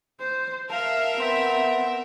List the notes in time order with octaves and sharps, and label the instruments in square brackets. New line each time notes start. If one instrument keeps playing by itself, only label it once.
[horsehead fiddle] C5
[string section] A#4 E5 [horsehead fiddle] F5 [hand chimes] A5
[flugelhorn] B3 [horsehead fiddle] C4 [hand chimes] C6 B6